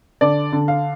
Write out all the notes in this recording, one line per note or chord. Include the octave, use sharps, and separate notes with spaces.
D3 D5
D3
F5